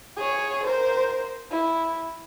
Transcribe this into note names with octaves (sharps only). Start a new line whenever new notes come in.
G#4 C#5
A#4 C5
E4